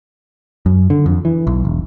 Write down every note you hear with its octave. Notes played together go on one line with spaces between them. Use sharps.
F#2
D3
F2
E3
B1
E1